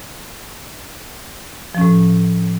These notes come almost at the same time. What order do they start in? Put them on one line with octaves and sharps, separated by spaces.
F3 C#4 A2